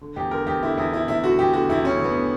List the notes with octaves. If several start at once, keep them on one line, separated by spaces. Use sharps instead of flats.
D3
E2 G4
D3 A#4
E2 G4
D3 E4
E2 E4
D3 E4
E2 E4
D3 F#4
E2 G4
D3 F#4
E2 E4
D3 C#4
E2 B3
D3